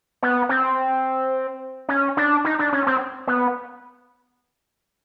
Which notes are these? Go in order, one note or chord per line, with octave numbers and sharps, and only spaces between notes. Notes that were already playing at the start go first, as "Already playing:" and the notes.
B3
C4
C#4
D4
D#4
D4
C#4
C4
B3